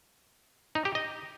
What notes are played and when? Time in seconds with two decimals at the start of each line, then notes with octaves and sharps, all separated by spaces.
0.75 D#4
0.85 G4
0.95 D#5